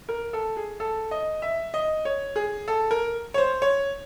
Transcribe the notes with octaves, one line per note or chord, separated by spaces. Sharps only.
A#4
A4
G#4
A4
D#5
E5
D#5
C#5
G#4
A4
A#4
C#5
C5
C#5